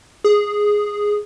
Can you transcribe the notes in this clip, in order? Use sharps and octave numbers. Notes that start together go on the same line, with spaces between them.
G#4